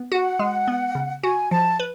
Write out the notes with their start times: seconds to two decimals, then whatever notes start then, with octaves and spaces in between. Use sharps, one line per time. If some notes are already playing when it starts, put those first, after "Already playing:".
Already playing: B3
0.12 F#4 F#5
0.39 G#3
0.68 B3
0.95 C#3
1.23 F#4 G#5
1.51 F3 A5
1.79 B4